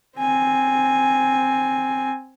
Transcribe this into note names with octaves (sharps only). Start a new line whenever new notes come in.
C4 G#5